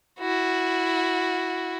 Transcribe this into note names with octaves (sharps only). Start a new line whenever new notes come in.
E4 F#4